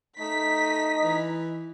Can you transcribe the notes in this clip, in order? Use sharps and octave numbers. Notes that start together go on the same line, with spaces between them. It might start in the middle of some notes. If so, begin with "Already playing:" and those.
A3 D#4 B6
E3